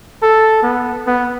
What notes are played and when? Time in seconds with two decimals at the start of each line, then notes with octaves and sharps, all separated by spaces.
0.23 A4
0.63 B3
1.07 B3